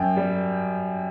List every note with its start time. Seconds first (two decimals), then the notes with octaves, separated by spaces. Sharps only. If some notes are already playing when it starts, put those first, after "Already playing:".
Already playing: F#2 G5
0.16 G3